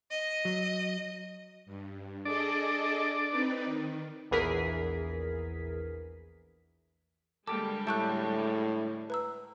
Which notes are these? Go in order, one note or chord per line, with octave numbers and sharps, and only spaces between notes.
D#5
F#3
G2
D4 G#4 A4 D5 D#5
C4 D#4 B4
D#3
A#1 E2 E3 G#4 A#4 B6
D3 G3 G#3 A#3 G4 A4 D6
A2 G4 A4 E5 A5 C#6 F#6
B4 A#5 E6